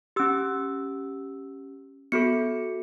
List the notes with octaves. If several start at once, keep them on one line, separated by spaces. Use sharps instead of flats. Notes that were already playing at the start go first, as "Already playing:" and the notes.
C#4 G4 E6
B3 F#4 A4 C#7